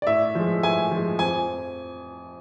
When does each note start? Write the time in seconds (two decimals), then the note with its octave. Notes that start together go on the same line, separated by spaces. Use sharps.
0.02 D5
0.07 A2 E5
0.35 F3 G#3
0.63 A2 G#5
0.91 F3 G#3
1.19 F2 G#5